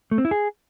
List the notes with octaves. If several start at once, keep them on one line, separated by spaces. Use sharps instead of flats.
A3
C4
E4
G#4